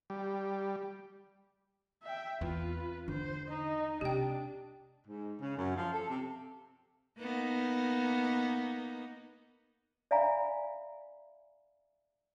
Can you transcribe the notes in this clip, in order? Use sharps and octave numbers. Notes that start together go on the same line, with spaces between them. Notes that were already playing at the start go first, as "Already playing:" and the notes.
G3
E5 G5
E2 C4 F4 B4
D3 C5
D#4 D#5
C3 D4 G4 G5
G#2
C#3
F#2
F3
A4
C3
A#3 B3 D#4
D5 E5 F5 G#5 A#5 B5